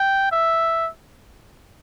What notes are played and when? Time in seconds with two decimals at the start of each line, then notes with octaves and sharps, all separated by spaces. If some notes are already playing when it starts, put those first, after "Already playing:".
Already playing: G5
0.32 E5